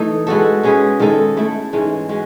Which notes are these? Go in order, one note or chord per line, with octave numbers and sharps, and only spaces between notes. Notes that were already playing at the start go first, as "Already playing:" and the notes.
Already playing: E3 A3 D#4
G#3 B3 F#4 A4
G#3 C#4 G#4 B4
D#3 G#3 D#4 A4
A3 E4 A4
G#2 E3 G#3 C#4
G#3 C#4 F#4